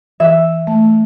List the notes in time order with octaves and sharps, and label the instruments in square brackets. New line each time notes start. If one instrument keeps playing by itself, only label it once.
[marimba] E3 [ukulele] E5
[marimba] A3